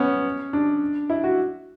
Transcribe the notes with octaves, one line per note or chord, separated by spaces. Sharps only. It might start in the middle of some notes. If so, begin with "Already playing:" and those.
Already playing: B3 C#4
D4
E4
F#4